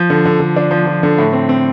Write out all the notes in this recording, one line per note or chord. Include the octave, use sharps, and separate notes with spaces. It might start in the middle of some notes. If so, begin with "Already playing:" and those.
Already playing: F3
D3
D3
D3
D4
F3
F3
D3
A2
C4
C4